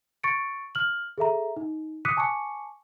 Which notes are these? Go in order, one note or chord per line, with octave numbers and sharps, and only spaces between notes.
C#6 A6 C#7 D7
F6 F#7
G#4 A4 E5 A#5
D#4
D6 D#6 F#6 B6 C#7 D#7
G#5 A5 C#6 D6 C#7